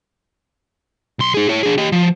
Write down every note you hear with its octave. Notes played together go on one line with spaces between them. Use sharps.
B1 C6
D#4 G#4
E4 C#5
D4 G#4
G4 D#5
F3